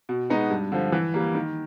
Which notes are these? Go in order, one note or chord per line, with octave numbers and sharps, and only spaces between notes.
B2
G#3 B3 D#4 F#4
G2
D3 F3
E3
G3 A#3
D#3